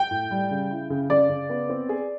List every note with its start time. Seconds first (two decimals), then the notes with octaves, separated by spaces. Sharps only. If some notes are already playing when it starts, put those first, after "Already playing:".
Already playing: G5
0.11 A2
0.31 G3
0.51 C#3
0.71 E4
0.90 C#3
1.10 C#3 D5
1.29 C#3
1.50 B3
1.69 C4
1.89 G#4